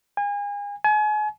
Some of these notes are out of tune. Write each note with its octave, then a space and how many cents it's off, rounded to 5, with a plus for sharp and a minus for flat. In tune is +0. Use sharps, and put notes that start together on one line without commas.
G#5 -35
G#5 +35